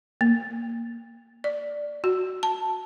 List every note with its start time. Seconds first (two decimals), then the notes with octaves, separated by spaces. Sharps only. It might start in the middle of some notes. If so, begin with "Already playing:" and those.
0.21 A#3
1.44 D5
2.04 F#4
2.43 A5